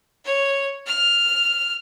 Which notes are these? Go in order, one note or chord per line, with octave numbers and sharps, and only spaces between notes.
C#5
F6